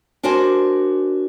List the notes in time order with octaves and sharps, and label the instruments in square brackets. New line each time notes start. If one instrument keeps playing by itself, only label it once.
[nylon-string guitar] D4 F#4 A#4 C5 D5 G#5